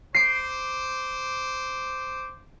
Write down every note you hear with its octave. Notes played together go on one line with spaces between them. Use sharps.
C5 D6 C7 D7